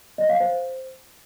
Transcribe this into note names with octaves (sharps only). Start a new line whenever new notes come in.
D#5
F5
C5